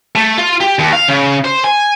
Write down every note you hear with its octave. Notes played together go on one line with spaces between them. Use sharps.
A3
F4
G4
D#2
F5
C#3
C5
G#5